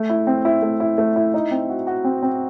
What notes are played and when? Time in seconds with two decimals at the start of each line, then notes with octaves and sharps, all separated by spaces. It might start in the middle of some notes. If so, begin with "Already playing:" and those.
Already playing: A3
0.10 E4
0.27 C4
0.45 E4
0.62 A3
0.80 E4
0.98 A3
1.16 E4
1.34 D#4
1.51 C4
1.69 F#4
1.87 F#4
2.04 C4
2.22 C4